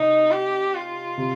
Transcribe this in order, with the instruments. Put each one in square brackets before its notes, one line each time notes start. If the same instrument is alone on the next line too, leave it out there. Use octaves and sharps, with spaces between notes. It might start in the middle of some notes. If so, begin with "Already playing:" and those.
Already playing: [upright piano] C3 [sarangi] D#4
[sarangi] G4
F4
[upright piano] C3